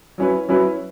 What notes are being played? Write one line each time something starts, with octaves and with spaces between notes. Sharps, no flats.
F#3 C#4 E4 B4
F#3 C#4 E4 B4